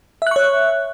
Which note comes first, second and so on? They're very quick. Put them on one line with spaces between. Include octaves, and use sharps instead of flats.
E5 F#6 C#6 C#5